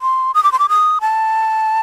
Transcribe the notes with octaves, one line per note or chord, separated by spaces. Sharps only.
C6
D#6
D6
C6
D6
D#6
A5